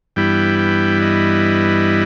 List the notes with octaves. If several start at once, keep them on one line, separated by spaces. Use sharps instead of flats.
G2 E3 G3 B3 E4 G5
G5
D#5